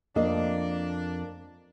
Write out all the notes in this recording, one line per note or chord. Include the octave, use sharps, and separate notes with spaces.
F2 A#3 D4 D#5